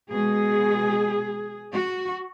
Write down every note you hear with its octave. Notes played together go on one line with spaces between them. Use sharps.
B2 G#3 G#4
F#4